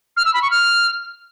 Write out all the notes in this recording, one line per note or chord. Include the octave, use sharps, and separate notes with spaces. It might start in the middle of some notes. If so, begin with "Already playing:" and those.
F6
E6
B5
C#6
F6